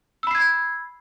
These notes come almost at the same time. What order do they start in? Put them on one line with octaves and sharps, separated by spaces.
E6 B5 C7 G#6